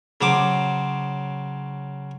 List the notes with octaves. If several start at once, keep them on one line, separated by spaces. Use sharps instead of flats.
C#3 F#3 C5 D6